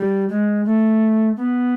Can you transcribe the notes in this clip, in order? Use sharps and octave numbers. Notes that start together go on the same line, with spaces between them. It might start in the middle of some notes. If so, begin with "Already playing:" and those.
Already playing: G3
G#3
A3
B3